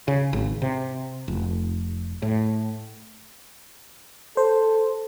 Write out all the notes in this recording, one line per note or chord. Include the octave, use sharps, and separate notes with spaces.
C#3
G#1
C3
F1
A2
A4 C5